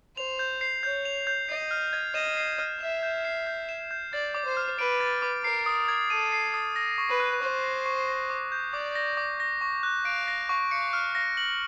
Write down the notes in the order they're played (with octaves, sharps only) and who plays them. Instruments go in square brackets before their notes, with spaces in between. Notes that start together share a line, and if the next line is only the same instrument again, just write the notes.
[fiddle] C5 [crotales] F7
[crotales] G6
C7
[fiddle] C#5 [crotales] G6
[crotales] F7
G6
[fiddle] D#5 [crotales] C7
[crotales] F6
G#6
[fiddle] D#5 [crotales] E7
[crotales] C7
F6
[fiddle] E5 [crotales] E7
[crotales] G6
C7
G6
E7
G6
[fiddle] D5 [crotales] A6
[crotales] D6
[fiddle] C5
[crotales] F6
[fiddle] B4 [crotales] D7
[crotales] A6
D6
[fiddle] A#4 [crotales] C7
[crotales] D#6
G#6
[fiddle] A4 [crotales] D#7
[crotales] C7
D#6
A#6
C#6
[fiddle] B4
[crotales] F#6
[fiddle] C5 [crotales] C#6
[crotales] A#6
C#6
A#6
D6
G6
[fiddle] D5 [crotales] D6
[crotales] A#6
D6
A#6
C#6
F#6
[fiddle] F5 [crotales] D7
[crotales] A#6
C#6
[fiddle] F5 [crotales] C#7
[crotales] F6
A#6
F#7